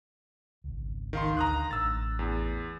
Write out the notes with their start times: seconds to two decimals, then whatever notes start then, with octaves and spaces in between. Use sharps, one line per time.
0.64 G#1 C#2
1.13 D#3 F5 C6
1.37 D2 D4 A#5 D#6 F#6
1.71 A1 A3 D4 E6 A6
2.19 E2